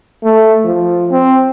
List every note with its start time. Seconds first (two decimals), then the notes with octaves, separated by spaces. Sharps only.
0.23 A3
0.65 F3
1.11 C4